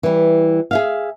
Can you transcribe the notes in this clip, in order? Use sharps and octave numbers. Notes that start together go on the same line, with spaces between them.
E3 G3
G#4 E5 F5